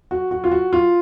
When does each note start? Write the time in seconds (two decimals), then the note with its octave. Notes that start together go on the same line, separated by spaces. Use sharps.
0.11 F#4
0.31 F#4
0.44 F4
0.51 F#4
0.73 F4